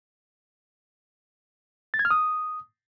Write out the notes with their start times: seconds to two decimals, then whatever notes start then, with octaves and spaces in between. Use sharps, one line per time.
1.94 A6
1.99 G#6
2.05 F6
2.11 D#6